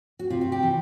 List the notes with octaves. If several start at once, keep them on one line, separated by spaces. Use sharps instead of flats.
F#4
C3 F4
F#4
G4
E3